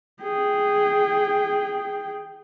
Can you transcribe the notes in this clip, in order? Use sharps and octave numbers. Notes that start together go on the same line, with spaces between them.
G#4 G5